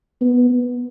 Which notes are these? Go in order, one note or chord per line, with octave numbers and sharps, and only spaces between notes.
B3
B3